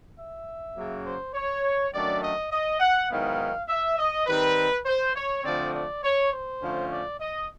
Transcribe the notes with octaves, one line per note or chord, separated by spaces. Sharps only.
E5
F#2 C#3 F#3 A#3
C5
C#5
F#2 D#3 F#3 A3 D4 D5
D#5
D#5
F#5
G#2 D#3 F#3 B3 E4 F5
E5
D#5
D#3 G3 C4 D#4 B4
C5
C#5
D3 F3 A3 C4 D5
D5
C#5
C5
D3 F3 A3 C#4
D5
D#5